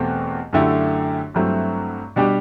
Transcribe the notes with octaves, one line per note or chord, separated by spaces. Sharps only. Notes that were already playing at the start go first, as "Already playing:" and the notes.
Already playing: E2 B2 A3 C4 G4
F#2 D3 A3 E4 G4
G2 F#3 A3 C4 E4
B2 G3 D4 G4